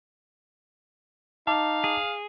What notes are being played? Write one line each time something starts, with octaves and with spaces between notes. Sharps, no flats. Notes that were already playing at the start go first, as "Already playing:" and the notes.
D#4 F5 A5 D6
G#4